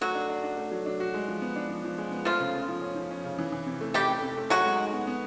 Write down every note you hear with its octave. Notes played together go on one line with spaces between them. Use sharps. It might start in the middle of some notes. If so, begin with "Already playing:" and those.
F#3 A3 F#4
D4
D4
D4
A3
F#3
D4
F#4
G#3
F3
B3
D4
F3
F3
G#3
B3
F3 A3 F4
C#3
C#3
F3
C#4
F3
C#4
C#3
E3
E3
C3
A3
G3 A3 G4
A3
C3
A3
F#3 F#4 G#4
G#3
D#4
B3
B3